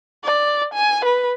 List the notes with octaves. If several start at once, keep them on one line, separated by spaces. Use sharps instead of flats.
D5
G#5
B4